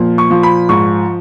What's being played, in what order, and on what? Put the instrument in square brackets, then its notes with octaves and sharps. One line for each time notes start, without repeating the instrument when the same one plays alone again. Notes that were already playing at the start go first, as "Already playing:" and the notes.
Already playing: [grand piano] A#2 F3
C#6
F3
B5
G#2 C#6